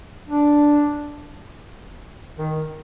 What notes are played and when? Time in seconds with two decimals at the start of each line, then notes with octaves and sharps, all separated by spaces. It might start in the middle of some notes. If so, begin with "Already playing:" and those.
0.28 D4
2.39 D#3